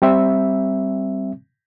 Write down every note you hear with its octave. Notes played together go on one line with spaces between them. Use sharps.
G3 C4 E5